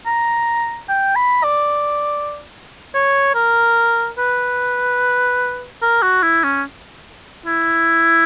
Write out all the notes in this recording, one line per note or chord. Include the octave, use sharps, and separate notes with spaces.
A#5
G5
B5
D5
C#5
A#4
B4
A#4
F#4
E4
C#4
E4